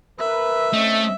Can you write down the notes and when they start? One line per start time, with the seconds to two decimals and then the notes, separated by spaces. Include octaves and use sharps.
0.19 A#4 B4 E5
0.74 A3 C4 C#4 D#5